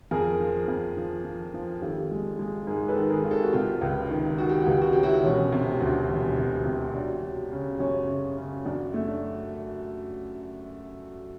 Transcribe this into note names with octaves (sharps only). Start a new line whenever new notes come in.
F2 G#4 A#4
F3
F2
F3
F3
F3
G#1 G4 A4
G#3
G#3
G#2 G#4 A#4
A4 B4
D#3
G#4 A#4
G#1
G4 A4
F#4
C3 F4 G4
C#2
D#3
D#3 F#4
G4
F#4
C#2 G4
F#4
F#3 G4
E4 F#4
E1 C#4
C3
D2
E1
C3
C3
F#3 D4
F#3
C#3
F#2 C#4
C#3
C#3
F#2 D4
A3
D4